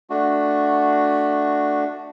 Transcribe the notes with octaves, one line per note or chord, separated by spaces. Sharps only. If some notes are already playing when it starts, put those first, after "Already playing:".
A3 D4 F#4